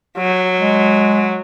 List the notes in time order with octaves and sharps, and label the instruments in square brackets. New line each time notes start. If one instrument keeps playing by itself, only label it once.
[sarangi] F#3
[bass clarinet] G#3